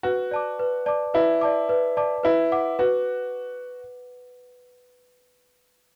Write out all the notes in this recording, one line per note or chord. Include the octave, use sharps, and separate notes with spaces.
F#4 B4
D5 A5 D6
B4
D5 A5 D6
E4 B4
D5 A5 D6
B4
D5 A5 D6
E4 B4
F#5 D6
F#4 B4